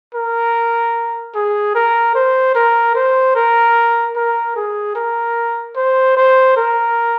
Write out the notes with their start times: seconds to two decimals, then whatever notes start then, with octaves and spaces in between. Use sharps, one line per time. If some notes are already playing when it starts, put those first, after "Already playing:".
0.15 A#4
1.35 G#4
1.75 A#4
2.15 C5
2.55 A#4
2.95 C5
3.36 A#4
4.16 A#4
4.56 G#4
4.96 A#4
5.76 C5
6.17 C5
6.57 A#4